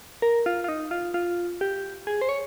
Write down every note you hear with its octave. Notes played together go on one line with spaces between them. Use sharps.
A#4
F4
F4
D#4
F4
F4
G4
G#4
C5
C#5